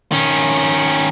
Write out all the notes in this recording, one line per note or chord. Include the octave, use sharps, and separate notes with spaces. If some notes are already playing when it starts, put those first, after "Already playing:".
D#3 C#4